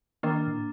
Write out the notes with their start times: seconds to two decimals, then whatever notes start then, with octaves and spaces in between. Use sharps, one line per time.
0.23 D#3 A#3 D4
0.47 A2